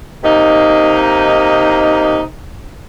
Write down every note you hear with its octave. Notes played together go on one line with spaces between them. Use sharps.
C3 A#3 D#4